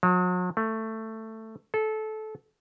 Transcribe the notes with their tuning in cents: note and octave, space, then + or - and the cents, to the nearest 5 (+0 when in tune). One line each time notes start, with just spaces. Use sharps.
F#3 -40
A3 +10
A4 -20